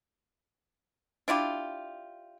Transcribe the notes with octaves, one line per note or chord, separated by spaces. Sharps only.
D4 E4 F4 G4